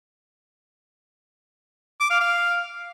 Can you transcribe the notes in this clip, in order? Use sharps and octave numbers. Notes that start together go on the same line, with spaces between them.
D6
F5
F5